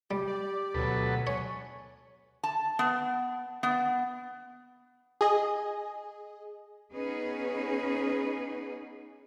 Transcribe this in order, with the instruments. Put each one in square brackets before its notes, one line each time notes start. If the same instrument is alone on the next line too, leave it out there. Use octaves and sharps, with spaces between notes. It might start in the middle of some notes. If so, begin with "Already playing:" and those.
[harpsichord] G3 [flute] G4
[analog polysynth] D5
[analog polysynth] D2 B2 F#3 [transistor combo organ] A4 B4
[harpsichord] C#5 [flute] G#5
[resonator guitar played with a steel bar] A5
B3
B3
[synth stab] G#4 D#5
[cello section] B3 C#4 D#4 G#4 B4